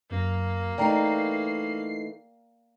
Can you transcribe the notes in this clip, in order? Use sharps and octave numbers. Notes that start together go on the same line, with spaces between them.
F#2 A#3
E3 A3 D#4 D5 G5 A#5 C7